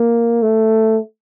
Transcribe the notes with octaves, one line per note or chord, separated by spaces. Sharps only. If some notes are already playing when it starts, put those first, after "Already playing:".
Already playing: A#3
A3